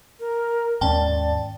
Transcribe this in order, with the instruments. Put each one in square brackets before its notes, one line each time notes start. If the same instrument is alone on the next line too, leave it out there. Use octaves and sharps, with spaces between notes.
[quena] A#4
[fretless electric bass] D#2 G#2 C#4 [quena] D5 [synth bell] G5 A5